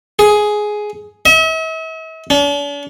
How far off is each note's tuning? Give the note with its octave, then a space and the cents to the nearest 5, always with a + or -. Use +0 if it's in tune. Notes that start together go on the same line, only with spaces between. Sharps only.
G#4 +10
E5 -45
D4 -45